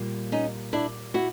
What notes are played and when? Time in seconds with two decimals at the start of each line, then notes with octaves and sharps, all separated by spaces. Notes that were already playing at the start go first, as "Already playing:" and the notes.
Already playing: A#2 G3 A#3
0.32 C#4 D#4
0.73 D4 E4
1.14 E4 F#4